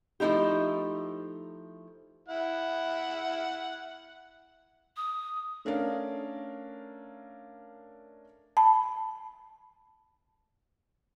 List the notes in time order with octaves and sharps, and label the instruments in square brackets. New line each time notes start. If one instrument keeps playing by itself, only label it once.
[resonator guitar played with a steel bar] F3 A3 D#4 E4 G4
[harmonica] E4 F#5
[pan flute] D#6
[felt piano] A3 C#4 D4 A#4 F5
[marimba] A5 B5